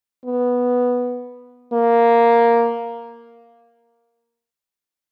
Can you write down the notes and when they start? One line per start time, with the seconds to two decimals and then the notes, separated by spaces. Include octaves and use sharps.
0.25 B3
1.73 A#3